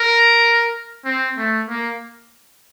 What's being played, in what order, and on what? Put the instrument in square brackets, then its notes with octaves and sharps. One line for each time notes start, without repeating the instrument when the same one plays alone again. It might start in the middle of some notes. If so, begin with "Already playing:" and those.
Already playing: [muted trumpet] A#4
C4
A3
A#3